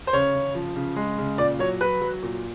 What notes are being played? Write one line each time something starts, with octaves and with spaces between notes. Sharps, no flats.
C5
C#3 C#5
C#3
F3
C#3
G#3
C#3
A#2 D5
F#3 C#5
F#3 B4
F#3
A#2